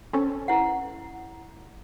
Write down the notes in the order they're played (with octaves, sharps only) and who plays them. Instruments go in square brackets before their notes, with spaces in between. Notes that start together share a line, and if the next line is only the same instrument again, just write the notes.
[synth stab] C4 C#4 A4
[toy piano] E4 F#5